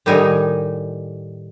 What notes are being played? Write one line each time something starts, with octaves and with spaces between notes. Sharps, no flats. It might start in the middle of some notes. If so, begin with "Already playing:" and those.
A2 D#3 G3 D#4 G#5